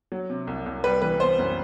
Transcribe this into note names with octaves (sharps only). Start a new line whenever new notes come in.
F#3
C3
C2
C2
G3 B4
E3 B4
B3 C5
F#2